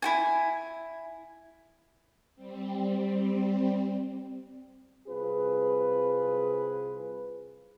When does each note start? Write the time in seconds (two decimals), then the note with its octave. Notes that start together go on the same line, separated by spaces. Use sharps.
0.02 E4 F#4 G#5
2.35 G3 C4
5.07 C2 C4 F4 G#4 B4